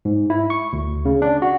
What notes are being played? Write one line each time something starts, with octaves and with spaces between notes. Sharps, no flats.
G#2
E4
C#6
D2
C#3
D4
F#4